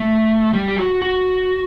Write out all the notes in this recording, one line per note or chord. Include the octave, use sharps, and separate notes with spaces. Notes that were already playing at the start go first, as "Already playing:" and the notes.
Already playing: A3
G3
G4
F#4
F#4